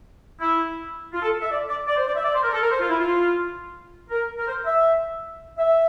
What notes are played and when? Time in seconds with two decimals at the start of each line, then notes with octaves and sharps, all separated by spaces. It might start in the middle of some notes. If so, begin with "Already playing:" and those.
0.39 E4
1.13 F4
1.22 A4
1.41 E5
1.50 D5
1.69 D5
1.87 D5
1.97 C5
2.06 D5
2.16 E5
2.24 D5
2.33 C5
2.43 A#4
2.52 A4
2.61 A#4
2.71 C5
2.80 F4
2.89 E4
2.99 F4
4.09 A#4
4.38 A#4
4.47 C5
4.65 E5
5.58 E5